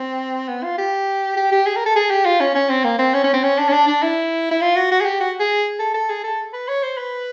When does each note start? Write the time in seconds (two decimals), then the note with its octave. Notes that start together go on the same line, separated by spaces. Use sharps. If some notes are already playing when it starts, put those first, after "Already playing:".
Already playing: C4
0.48 B3
0.64 F4
0.78 G4
1.37 G4
1.52 G4
1.67 G#4
1.76 A#4
1.86 A4
1.96 G#4
2.11 G4
2.25 F4
2.41 C#4
2.55 C#4
2.70 C4
2.84 A#3
2.99 C4
3.14 C#4
3.24 C#4
3.34 C4
3.44 C#4
3.58 D4
3.69 C#4
3.73 D4
3.88 D4
4.03 E4
4.51 E4
4.62 F4
4.76 F#4
4.91 F#4
5.01 G#4
5.06 G4
5.20 F#4
5.40 G#4
5.79 A4
5.94 A4
6.09 G#4
6.24 A4
6.53 B4
6.68 C#5
6.83 C5
6.98 B4